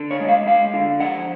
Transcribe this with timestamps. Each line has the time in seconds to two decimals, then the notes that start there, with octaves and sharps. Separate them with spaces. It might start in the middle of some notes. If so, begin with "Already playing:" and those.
Already playing: D3
0.11 C#5
0.20 G#3
0.29 F5
0.47 G#3 F5
0.73 D3
1.00 F3 F#5